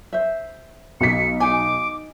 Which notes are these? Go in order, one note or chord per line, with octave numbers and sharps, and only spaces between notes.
C5 E5
B1 B6 C#7
D#4 G#5 D6